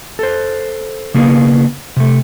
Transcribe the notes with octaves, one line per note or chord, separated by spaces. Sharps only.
A4 C5
C#3 A#3 B3 G#4
C3 A3